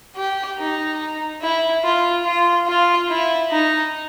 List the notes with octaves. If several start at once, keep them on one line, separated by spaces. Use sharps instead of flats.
G4
D#4
E4
F4
F4
F4
E4
D#4